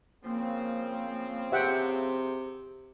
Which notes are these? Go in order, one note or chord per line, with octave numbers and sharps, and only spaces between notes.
C#3 F3 A#3 C4
C3 G#4 E5 F#5 G5